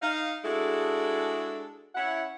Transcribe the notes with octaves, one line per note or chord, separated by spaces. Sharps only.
D#4 F5
G#3 D4 E4 F#4 G#4 A4
C#4 E4 F#5